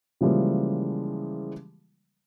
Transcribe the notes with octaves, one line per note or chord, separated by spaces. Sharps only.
C#3 E3 F3 G3 G#3 A#3